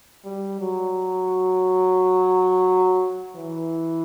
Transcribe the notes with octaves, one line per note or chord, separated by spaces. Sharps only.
G3
F#3
E3